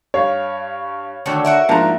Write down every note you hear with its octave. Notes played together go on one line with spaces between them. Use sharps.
G2 C#5 F5
D3 D#3 F#3 A3
F#4 A#4 E5
G#2 F3 A#3 D4 A#5